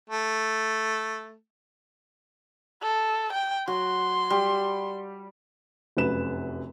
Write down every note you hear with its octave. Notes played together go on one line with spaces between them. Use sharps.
A3
A4
G5
F#3 C6
G3
F1 F#2 B4 E7